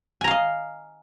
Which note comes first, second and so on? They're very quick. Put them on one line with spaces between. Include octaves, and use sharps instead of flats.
G#5 A#5 F5 D#5